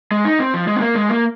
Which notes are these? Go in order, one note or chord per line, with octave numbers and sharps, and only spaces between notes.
G#3
D#4
C4
F3
G#3
C4
A#3
G#3
A#3